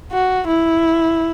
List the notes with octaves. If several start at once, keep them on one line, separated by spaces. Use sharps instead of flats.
F#4
E4